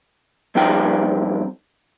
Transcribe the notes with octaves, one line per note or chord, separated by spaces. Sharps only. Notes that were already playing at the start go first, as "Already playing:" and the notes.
G2 F3 C4 D#4 G5